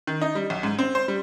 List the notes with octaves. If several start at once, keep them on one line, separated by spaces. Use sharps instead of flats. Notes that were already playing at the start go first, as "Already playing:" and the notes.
D#3
D#4
G3
B1
G#2
C4
C5
G3